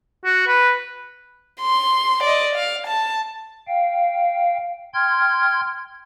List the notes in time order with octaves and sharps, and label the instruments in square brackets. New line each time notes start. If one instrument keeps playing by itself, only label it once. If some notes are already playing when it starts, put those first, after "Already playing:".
[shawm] F#4
B4
[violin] C6
D5 D#5
F5
A5
[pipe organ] F5 G5
G5 C6 F6 G#6